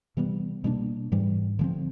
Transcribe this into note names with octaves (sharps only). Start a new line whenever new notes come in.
C3 E3 G3 B3
B2 G3 A#3 D4
G#2 E3 G3
D3 F3 G#3 C4